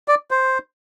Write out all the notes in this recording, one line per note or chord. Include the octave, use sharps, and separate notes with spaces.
D5
C5